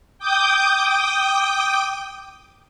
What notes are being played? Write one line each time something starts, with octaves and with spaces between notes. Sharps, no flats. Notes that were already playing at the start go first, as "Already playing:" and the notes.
G5 D6 D#6 G6